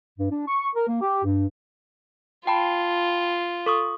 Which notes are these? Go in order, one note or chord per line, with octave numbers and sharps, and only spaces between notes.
G2
D4
C#6
A#4
A#3
G4
G2
F4 G5 A5 B5
A4 C#6 D#6